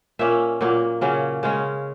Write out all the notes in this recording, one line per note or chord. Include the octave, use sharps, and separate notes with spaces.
A#2 A#3 C#4 E5
A#2 F#3 A#3
C#3 F#3 A#3 C#4
C#3 G#3 C#4